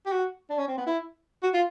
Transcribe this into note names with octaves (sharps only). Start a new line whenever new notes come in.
G4
F#4
D4
C#4
C4
B3
E4
F#4
F4